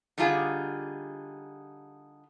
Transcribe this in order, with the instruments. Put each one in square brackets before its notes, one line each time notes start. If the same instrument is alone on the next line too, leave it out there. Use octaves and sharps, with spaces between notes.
[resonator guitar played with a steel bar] D3 G3 D#4 F4 G#4